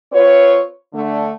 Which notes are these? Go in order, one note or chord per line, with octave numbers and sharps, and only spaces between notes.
C4 F4 B4 C#5
D3 A3